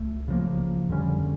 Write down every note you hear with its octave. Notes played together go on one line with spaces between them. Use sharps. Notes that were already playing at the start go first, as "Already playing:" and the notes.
Already playing: C#2 A3
C#3 F3 A#3
F2 D3 G3 C#4